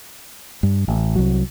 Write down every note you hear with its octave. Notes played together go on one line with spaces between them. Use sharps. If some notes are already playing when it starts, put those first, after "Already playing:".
G2
A1
C2 F#3